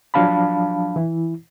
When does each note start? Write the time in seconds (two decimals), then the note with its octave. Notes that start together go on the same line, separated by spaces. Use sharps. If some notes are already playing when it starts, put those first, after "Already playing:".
0.14 F3 F#3 D4 F5 A5 B5
0.96 E3 E4